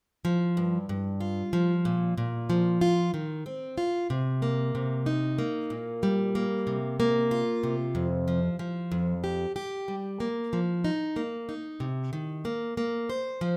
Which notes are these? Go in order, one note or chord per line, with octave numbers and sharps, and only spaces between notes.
F3
G2
G2
F4
F3
A#2
A#2
F3
F4
D#3
C4
F4
C3
A#3
C3
D#4
A#3
A#2
G3
A#3
C3
A#3
F4
C3
F2
F3
F3
F2
G4
G4
G3
A#3
F3
D#4
A#3
D#4
C3
D#3
A#3
A#3
C5
F3